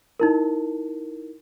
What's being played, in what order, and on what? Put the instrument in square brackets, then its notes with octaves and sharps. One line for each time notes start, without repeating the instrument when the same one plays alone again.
[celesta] D#4 E4 A#4